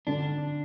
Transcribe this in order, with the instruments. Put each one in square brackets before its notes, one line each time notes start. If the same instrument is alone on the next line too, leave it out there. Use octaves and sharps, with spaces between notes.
[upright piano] D3 [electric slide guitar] D4